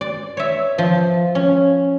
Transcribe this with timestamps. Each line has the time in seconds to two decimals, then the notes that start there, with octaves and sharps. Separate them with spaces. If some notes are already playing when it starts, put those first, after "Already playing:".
0.01 D5
0.37 C#5 E5
0.78 F3
1.35 C#4